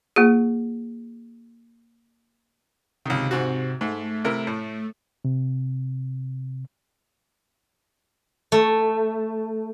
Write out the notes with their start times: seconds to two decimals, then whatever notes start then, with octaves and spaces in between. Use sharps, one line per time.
0.16 A#3 F4 G#4
3.06 C#2 C3 D#3
3.31 G#2 C4 F#4
3.81 G#2 A3
4.25 C3 E4 A#4
4.47 A2
5.25 C3
8.52 A3